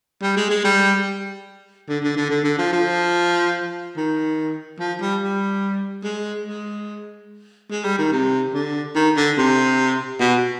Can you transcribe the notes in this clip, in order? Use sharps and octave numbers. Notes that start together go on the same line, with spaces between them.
G3
G#3
G#3
G3
D3
D3
D3
D3
D3
F3
F3
D#3
F3
G3
G3
G#3
G#3
G#3
G3
D#3
C3
D3
D#3
D3
C3
B2